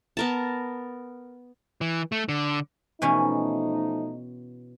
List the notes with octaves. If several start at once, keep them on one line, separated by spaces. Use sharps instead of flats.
B3 A#4 A5
E3
A3
D3
B2 E3 F3 A3 C#4 D#4